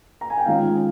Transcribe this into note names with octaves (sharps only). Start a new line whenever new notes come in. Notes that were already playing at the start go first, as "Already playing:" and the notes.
A#5
G#5
G5
D#3 G#3 C#4 F4 F5